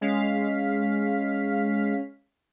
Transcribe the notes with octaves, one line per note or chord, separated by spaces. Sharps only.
G#3 C#4 F5 B6